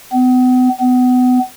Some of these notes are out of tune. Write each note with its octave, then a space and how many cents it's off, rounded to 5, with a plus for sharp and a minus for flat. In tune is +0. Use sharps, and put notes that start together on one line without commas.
B3 +40
B3 +30